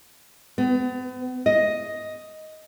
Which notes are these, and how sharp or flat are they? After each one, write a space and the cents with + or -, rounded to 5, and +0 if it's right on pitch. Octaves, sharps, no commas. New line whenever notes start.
B3 +40
D#5 +5